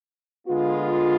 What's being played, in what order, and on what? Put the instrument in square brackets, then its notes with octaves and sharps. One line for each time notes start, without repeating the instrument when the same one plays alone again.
[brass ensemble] D3 G#3 B3 F4